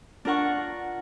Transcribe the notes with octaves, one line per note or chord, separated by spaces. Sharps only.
D4 F4 A#4 F#5 C#6